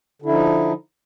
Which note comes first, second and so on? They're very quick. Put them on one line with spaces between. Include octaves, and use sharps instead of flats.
D3 E4 F3 D#4